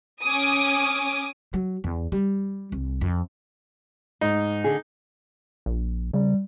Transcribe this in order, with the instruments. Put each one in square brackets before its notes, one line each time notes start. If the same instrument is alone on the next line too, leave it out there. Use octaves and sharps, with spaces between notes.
[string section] C#4 G#5 D6 D#6
[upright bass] F#3
E2
G3
C2
F2
[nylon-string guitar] G#2 [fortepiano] D#4
[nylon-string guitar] D3 G#4
[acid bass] A#1
[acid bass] C#3 [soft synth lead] G3